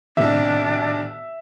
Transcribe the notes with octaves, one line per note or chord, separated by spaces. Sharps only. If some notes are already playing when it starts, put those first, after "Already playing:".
B1 A2 C3 D#3 D4 E5